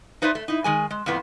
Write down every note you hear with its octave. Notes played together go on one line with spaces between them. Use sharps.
D#4 B4 C5 D5 E5
A3
D#4 E4
D#3 G#3 G#5
G#3
F2 A2 F3 B3